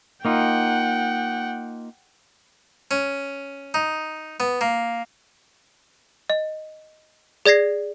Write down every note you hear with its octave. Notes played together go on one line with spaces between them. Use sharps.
A#3 D#4 F4 F#5 G5
C#4
D#4
B3
A#3
D#5
G#4 D5 G#6 A#6 C7